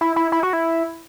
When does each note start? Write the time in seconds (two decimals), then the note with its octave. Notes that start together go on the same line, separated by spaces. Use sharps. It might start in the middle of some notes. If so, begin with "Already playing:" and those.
0.01 E4
0.16 E4
0.32 E4
0.43 F#4
0.53 E4